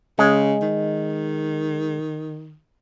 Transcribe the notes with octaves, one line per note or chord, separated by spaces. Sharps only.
C#3 G#3
D#3